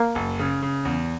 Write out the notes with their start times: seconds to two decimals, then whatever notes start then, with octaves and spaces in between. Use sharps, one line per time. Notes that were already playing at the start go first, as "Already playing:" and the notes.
Already playing: A#3
0.15 F#1
0.39 C#3
0.62 C#3
0.85 E2